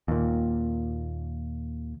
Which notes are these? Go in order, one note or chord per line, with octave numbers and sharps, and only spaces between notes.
D#2 A#2